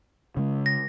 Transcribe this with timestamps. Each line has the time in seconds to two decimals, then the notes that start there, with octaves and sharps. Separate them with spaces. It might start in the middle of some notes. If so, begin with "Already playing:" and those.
0.37 C#3 G#3
0.66 A#6